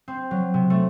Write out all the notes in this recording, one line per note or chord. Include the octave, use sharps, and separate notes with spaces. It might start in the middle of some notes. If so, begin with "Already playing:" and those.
C4
F#3
C3
A3